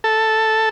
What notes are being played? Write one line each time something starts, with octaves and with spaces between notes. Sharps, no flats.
A4